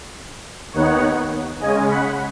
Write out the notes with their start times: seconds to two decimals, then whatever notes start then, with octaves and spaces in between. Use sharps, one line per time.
0.73 D#2 D#3 B3 D#4 C#5 F#5
1.60 C#3 G#3 C#4 D#5 G#5
1.89 F#5 B5